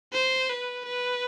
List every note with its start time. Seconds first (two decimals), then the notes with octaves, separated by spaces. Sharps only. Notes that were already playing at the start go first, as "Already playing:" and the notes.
0.13 C5
0.49 B4
0.86 B4